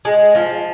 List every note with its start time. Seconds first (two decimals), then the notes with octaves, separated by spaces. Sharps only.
0.05 G#3
0.35 F3